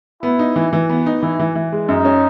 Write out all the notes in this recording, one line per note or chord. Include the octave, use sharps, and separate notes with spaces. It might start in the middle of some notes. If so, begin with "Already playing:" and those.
B3 E4
D#4
E3
E3
B3
D#4
E3 E4
E3
E3
G#3
F#2 D#4
C#4